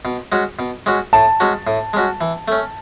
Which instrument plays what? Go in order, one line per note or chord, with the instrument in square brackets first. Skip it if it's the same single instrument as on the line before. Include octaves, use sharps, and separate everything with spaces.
[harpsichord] B2
G#3 C#4 F#4
B2
G#3 C#4 F#4
[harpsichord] A2 [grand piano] A5
[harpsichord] G#3 C#4 F#4
A2
G#3 C#4 F#4
E3
A3 C#4